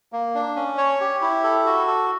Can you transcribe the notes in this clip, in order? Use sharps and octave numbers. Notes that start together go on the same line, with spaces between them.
A#3
D4
C#4
C#5
G4
E4
A4
F#4
A4